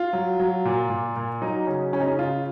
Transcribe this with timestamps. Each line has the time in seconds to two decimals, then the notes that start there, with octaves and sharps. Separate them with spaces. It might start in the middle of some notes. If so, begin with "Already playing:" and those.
Already playing: F4
0.13 F#3
0.40 F#3
0.65 A#2
0.90 A#2
1.16 A#2
1.42 F#3 D#4
1.67 C#3 C#4
1.93 C#3 C#4
2.00 D#4
2.07 C#4
2.19 C#3 F4